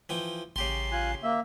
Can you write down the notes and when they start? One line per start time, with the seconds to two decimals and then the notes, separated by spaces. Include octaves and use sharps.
0.09 E3 F3 G5
0.56 A1 C#3 G4 C6 C7
0.92 F4 G#5 F#6
1.23 A#3 E5